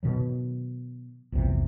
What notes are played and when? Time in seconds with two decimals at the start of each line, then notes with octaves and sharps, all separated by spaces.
0.03 B2 D#3 F#3
1.32 A#1 E2 G2 C3